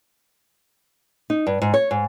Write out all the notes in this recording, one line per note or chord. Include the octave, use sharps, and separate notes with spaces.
D#4
G2
G#2
C#5
G#2